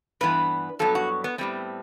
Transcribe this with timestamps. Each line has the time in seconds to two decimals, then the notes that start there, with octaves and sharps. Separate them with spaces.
0.21 G2 E3 B3 B4
0.79 G2 F#3 B3 A4
0.95 F#4
1.24 B3
1.38 A2 G3 B3 C4